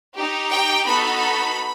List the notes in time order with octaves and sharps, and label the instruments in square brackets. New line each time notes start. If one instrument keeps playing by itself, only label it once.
[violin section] D#4 G4
G5
B3 D#4 F#4 A4 B5